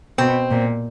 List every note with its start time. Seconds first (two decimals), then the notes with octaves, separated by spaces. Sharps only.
0.18 B2 C4
0.51 A#2